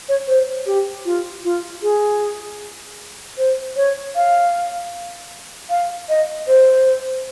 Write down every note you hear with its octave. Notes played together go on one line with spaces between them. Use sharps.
C#5
C5
G4
F4
F4
G#4
C5
C#5
F5
F5
D#5
C5